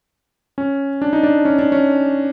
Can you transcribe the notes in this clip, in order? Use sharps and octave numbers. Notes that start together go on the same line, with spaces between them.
C#4
D4
D#4
D4
C#4
D4
C#4